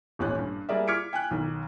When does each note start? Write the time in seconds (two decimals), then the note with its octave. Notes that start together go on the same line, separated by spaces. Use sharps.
0.19 D#1 A1 C#4 F#6
0.39 G2
0.69 G3 A#3 G#4 A#4 D5 E5
0.87 D6 F6 G#6 B6 C#7 D7
1.13 G5 G#5 F#6
1.31 B1 D#3